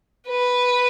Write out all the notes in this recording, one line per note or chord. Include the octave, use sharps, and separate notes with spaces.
B4